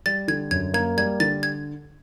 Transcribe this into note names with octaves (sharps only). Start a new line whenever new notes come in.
G3 A6
D3 G#6
F#2 G#6
A#3 G#6
G3 G#6
D3 A6
G#6